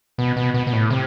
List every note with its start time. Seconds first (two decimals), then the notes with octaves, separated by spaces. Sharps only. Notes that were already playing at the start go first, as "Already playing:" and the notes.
0.18 B2
0.36 B2
0.54 B2
0.67 B2
0.73 A2
0.91 C3